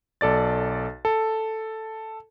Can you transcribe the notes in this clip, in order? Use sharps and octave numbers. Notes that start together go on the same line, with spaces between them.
B1 A4 D5 A6
A4